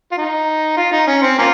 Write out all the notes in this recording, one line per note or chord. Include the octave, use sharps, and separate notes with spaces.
F4
D#4
F4
D#4
C#4
C4
A#3 C#4 F4